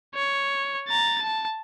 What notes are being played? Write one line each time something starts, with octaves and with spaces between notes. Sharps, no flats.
C#5
A#5 A6
A5